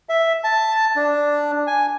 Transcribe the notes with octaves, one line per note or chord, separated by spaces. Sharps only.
E5
A5
D4
G#5